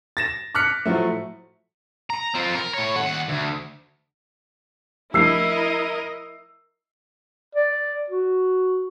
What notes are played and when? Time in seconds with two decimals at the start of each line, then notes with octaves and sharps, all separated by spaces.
0.17 A6 A#6 E7
0.55 D6 F6 F#6 B6 C#7
0.85 A2 F3 F#3 A3
2.10 A#5
2.35 C4 F4
2.55 A#4
2.74 A2 C#5
2.96 D#2 F#5
3.29 D2
5.14 F3 A3 D4 E4 A#4 D#5 E6 C7
7.55 D5
8.10 F#4